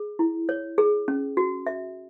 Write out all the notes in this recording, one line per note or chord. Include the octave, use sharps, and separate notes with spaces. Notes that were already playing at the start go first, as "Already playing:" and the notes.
Already playing: G#4
E4
C#5
G#4
C#4
F#4
E5